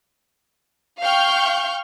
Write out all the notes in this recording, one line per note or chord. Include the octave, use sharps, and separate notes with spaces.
F5 G5 C#6 F6 G6